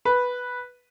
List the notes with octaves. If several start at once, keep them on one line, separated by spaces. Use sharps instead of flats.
B4